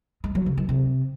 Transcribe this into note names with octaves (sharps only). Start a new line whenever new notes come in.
G#3
F#3
C#3
D#3
C3